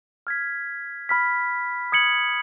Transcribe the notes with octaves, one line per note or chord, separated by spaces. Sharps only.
F6 G#6 B6
B5 F6 B6
D#6 G#6 C#7 F#7